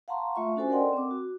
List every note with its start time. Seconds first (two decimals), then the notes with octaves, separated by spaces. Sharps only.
0.08 F5 F#5 A5 A#5 C6 C#6
0.35 A3 F4 E5 C#6
0.56 C#4 D4 F#4 A4 C5 G#5
0.70 A#4 D5 D#5 F#5 G5 C6
0.93 C4 D6
1.11 F#4